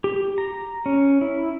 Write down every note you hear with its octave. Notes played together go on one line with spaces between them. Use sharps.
G4
A#5
C#4
E4